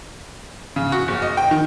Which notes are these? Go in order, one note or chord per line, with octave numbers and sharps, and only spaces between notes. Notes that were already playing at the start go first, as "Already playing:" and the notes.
C#3
F#4
F#1
D#5
G5
D#3